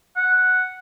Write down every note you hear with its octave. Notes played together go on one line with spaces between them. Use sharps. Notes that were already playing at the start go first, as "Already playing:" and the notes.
F#5